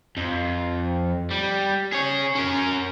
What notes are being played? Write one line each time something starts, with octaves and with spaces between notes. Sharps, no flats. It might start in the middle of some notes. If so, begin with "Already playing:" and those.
F2
G3
G#4 C#5
C#4 A#4